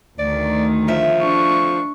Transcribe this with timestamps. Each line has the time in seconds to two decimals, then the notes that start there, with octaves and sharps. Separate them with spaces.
0.19 D2 D#3 D5
0.88 F3 E5
1.20 D4 C#6